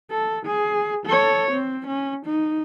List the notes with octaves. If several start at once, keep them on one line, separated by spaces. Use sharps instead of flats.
A4
G#4
A4 C#5
C4
C#4
D#4